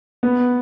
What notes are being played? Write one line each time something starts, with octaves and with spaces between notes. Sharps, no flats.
B3